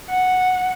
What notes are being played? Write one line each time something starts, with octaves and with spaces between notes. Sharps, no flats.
F#5